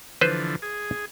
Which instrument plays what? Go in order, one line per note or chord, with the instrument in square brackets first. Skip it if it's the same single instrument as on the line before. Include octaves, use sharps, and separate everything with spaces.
[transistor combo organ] D3 E3 F3 [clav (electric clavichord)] B4 C5
[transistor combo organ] G#4